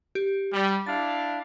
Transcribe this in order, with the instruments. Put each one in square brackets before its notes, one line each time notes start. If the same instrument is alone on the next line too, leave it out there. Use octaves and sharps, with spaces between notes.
[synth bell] G4
[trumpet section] G3
[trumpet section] D4 E4 F5 [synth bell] A6